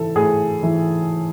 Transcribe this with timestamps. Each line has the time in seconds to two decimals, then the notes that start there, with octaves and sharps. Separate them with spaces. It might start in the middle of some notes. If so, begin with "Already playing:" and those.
Already playing: E3 A4
0.16 A2 G#4
0.63 E3